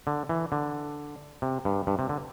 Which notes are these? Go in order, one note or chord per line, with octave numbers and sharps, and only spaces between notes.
D3
E3
D3
C3
G2
G2
C3
D3